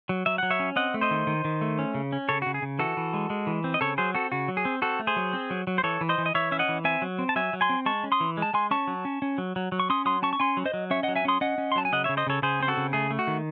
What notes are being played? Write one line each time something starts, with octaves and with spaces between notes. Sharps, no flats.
F#3
F#3 E5
F#3 F#5
C#5 E5
C#4
C4 D#5 F#5
A3
C5 D#5
D#3
D#3
D#3
A3
C#4
C#3
C#4
C#3 A4 C#5
F#4
C#3
G#4
C#3
E3 F#4 A4
E3
G#3
G#3
E3
C4
D#5
C#3 A4 C#5
F#3 G#4 C5
C4 F#4 A4
C#3 F#4
F#3
G#4
C4
C4 F#4 A4
A3
G#4 C5
F#3
C4
F#3
F#3
C5
E3 A4 C#5
E3
C5 D#5
E3
D#5
E3 C#5 E5
C#4 E5
D#5 F#5
E3
C4 E5 G#5
F#3
C4
A5
F#3 E5 G#5
F#3
G#5 C6
C4
G#3 A5 C#6
C#4
C6 D#6
E3
G#3
A5
G#3 G#5 C6
C#4 A5 C#6
F#3
C#4
C#4
F#3
F#3
F#3
C#6
C#4 C6 D#6
F#3 C6 D#6
C#4 A5 C#6
C#6
C#4 G#5 C6
F#3
C5 D#5
F#3
C#4 C#5 E5
D#5 F#5
F#3
E5 G#5
C#4 C6 D#6
C#4 D#5 F#5
C#4
C6
F#3 A5
G#5
C#3 D#5 F#5
C#3 C#5 E5
C5 D#5
C#3 A4 C#5
C#3 G#4 C5
C4 C5
F#4 A4
C#3
A3 G#4
A3
F#4
D#3